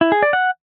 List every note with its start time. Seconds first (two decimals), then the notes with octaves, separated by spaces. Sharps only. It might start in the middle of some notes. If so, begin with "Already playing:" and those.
0.01 E4
0.12 G#4
0.22 D5
0.33 F#5